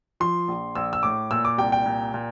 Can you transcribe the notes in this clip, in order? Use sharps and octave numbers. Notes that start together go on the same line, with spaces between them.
F3 C6
A#1
A#1 E6
E6
A2 D6
A#2 E6
D6
C2 G5
G5
A#2
A#2